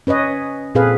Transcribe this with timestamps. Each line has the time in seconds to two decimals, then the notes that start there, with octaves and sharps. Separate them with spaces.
0.07 C#4 B4 C#5 D#5
0.75 A#2 C4 G#4 A4 B4 F5